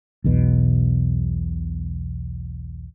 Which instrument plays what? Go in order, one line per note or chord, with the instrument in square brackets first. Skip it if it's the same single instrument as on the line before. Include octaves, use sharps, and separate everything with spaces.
[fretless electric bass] B1 E2 B2